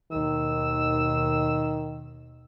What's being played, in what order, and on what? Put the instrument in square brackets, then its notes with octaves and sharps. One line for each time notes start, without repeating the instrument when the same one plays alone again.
[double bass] D#2 B2 [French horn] D#3 [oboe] E6